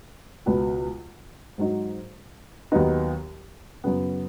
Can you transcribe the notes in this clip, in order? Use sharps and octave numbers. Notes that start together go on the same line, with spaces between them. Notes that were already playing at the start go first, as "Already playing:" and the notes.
C#2 B2 B3 F#4
G#2 F#3 D#4 F#4
D#2 D#3 F#3 B3 D#4
F#2 C#3 B3